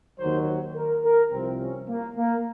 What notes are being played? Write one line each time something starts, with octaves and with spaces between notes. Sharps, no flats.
D#2 D#3 F#3 C5
A#4
A#4
C2 C3 F3 C4
C#4
A#3
A#3